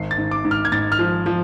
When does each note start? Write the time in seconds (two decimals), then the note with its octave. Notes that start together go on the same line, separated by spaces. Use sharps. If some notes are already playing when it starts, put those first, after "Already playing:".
Already playing: G#1 C7
0.11 A6
0.18 G#2
0.31 D6
0.44 G#2
0.51 F6
0.65 G#6
0.72 G#2 A6
0.92 F6
0.99 F3
1.26 F3